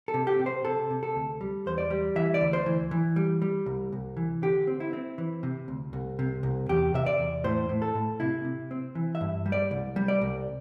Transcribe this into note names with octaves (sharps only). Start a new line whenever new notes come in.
A4
C3
G4
C3
C5
C3 A4
C3
A4
D2
G3
E2 C5
D5
G3
E3 E5
D5
D2
C5
E3
E3
G3
G3
C2
C2
E3
D3 G4
C4
E4
C4
E3
C3
D2
C2
C3
C2
E2 G4
C3 E5
D5
E2
A2 C5
A2
A4
A2
C3 E4
C3
C4
E3
E5
G2
G3
D5
C2
G3
D5
C2